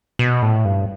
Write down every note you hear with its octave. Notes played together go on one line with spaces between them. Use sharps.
B2
A2
G2